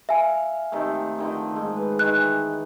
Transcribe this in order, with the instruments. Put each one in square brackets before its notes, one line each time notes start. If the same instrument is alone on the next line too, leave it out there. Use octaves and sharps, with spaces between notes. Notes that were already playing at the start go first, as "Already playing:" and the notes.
[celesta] E5 G#5 [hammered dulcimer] F5
[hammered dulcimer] C3 D#3 A3
D3 D#3 F3
G#2
B4
[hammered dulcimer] D#3 E3 [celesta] F#6